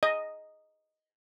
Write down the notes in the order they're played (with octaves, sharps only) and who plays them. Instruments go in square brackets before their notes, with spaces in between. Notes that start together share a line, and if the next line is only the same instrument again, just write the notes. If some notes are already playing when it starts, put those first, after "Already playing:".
[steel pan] D#5